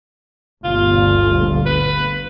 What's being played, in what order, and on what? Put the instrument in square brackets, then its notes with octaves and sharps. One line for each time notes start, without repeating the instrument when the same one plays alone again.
[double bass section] G1 D2 A#2 [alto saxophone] F4
[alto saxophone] B4